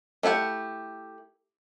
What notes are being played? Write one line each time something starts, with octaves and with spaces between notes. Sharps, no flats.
A3 E4 G4 F#5